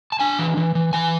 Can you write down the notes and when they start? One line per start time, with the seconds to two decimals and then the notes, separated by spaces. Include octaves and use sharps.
0.12 A5
0.20 D4 G#5
0.39 E3
0.57 E3
0.75 E3
0.93 E3 G#5